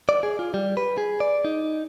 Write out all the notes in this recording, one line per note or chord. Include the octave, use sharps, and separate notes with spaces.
D5
G#4
F4
G3
B4
G#4
D5
D#4